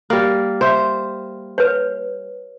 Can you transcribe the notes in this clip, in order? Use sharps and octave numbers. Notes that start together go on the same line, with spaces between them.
G3 A#3
C5 E5
B4 C#5